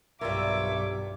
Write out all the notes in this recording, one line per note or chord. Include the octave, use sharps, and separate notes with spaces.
B1 G2 G3 F4 A#4 C#5 E5 D6